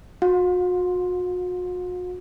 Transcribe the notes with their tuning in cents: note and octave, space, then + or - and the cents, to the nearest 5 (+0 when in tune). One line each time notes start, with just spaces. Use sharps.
F#4 -40 F5 +45